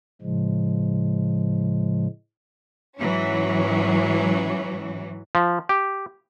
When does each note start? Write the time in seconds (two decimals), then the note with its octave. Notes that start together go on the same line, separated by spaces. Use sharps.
0.22 A2 C#3 F3 G#3
2.98 G#2 E3 F#3 C#4
5.35 F3
5.69 G4